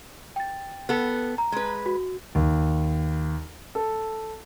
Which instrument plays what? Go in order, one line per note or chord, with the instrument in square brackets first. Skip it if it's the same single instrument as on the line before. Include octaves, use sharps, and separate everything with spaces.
[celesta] G5 A6
[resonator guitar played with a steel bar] B3 A4
[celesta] A#5
[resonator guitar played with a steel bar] G#3 B4
[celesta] F#4
[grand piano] D#2
A4